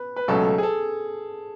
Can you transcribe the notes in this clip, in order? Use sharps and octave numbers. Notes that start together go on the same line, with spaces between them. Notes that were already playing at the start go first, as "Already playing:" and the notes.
Already playing: B4
B4
C#2 B2 F#3 A3 C#4 A4
G#4
A4